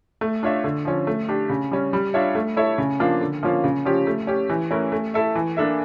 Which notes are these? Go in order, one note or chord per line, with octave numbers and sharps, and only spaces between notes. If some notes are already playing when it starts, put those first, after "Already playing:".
A3
D4 F4 C#5 E5
D3
F3 C#4
A3
D4 G4
C#3
G3 C#4
G3
D4 F4 C#5 E5
A3
E4 A4 C#5 E5
C#3
F3 A#3 D4 F4
D3
F3 A#3 C#4 F4
C#3
F3 C#4 G4
A3
C#4 G4
E3
A3 C#4 E4 A#4
A3
E4 A4 E5
E3
A#3 D4 A4 E5